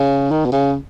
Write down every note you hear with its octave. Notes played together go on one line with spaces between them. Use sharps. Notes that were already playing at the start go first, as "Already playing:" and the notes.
Already playing: C#3
D#3
B2
C#3